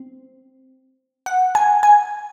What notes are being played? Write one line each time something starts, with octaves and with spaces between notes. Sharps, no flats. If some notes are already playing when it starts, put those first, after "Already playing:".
Already playing: C4
F#5
G#5
G#5